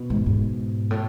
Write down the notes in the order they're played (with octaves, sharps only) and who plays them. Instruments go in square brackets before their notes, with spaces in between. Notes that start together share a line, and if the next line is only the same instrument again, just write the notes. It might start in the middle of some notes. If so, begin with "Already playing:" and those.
Already playing: [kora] B2
[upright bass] G#2
G#2
A2